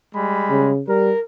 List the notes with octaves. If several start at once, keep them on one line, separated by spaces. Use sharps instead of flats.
G3 G#3 B5
C#3
G3 A#4